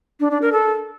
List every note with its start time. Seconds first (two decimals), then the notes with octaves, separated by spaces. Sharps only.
0.20 D4
0.31 D4
0.42 A#4
0.52 A4